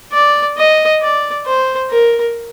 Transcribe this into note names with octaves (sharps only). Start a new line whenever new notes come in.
D5
D#5
D5
C5
A#4